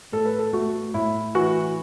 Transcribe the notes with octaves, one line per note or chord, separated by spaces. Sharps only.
A2 A4
B4
A4
A3 F#4
A2 E4
E3 F#4